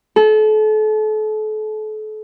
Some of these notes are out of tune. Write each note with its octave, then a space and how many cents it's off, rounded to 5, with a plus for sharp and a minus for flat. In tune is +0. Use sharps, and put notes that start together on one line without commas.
A4 -35